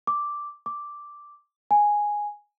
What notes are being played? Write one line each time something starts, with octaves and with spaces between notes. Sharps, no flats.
D6
D6
G#5